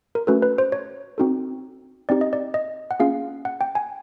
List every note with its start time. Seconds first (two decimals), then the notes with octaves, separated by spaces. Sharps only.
0.15 A#4
0.27 A3 C#4 F#4 A4 B4
0.42 B4
0.58 C5
0.72 C#5
1.18 C4 D#4 F#4 A4
2.09 C4 D#4 G4 D5
2.21 D#5
2.33 D5
2.54 D#5
2.91 F#5
3.00 A#3 C#4 F4 G#4 F5
3.45 F#5
3.61 G5
3.75 G#5